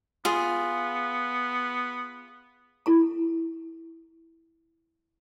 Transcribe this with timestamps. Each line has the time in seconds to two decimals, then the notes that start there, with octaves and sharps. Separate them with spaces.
0.25 B3 F4 G#4
2.86 E4 A4 A#5